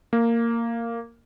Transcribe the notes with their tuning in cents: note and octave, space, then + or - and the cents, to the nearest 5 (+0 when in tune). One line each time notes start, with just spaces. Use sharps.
A#3 -10